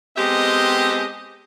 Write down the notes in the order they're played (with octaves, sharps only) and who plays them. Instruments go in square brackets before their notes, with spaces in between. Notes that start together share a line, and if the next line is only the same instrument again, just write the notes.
[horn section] G#3 B3 C4 G4 A4 D#5